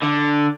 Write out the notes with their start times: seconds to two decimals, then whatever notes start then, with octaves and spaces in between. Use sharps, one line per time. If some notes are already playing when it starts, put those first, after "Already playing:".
0.02 D3